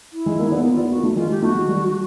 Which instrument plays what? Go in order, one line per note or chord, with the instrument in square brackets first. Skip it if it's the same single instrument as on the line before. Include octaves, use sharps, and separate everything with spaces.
[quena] E4
[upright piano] G#3
A#3
B3
[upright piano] A#3 [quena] F4
[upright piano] B3
[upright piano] A#3 [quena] F#4
[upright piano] A3
[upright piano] G#3 [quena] F4
[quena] G4
[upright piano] A3 [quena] F#4
[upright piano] G#3
G3